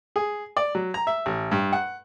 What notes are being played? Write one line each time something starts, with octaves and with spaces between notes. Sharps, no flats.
G#4
D5
F#3
A#5
E5
A1
G2
F#5